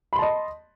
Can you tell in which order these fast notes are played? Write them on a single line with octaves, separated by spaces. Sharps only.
B5 C6 A5 D#5